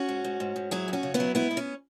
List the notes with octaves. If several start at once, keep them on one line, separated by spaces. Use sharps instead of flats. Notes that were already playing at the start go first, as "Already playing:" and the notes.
Already playing: C#4 F#4
G#2
G#2
G#2
G#2
F#3 E4 G#4
F#2
C#4 F#4
C#3
B3 E4
F#3
G#2 B3 E4
B3
C#4